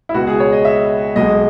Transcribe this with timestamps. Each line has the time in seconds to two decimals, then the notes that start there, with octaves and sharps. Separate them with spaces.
0.09 E4
0.14 C#2 B2 G#3 B3 F#4
0.27 G#4
0.40 C#5
0.52 D#5
0.65 E5
1.16 B1 B2 G#3 D#5